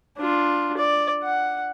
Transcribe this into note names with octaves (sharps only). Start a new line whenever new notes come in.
D4 F4
D5
F#5